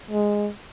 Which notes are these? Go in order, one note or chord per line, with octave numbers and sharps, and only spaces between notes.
G#3